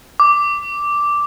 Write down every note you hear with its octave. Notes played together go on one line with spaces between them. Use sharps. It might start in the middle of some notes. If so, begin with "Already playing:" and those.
D6